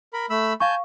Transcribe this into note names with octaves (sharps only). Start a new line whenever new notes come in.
A#4 B5
A3 B5 E6
F5 G#5 A5 C#6 G6